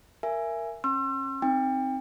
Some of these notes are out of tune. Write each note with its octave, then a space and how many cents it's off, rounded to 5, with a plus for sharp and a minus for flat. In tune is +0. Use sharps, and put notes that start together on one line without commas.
A#4 -5 E5 +20 G#5 +0
C#4 -35 C6 +35 E6 +40
C4 +0 D#4 +0 G5 +30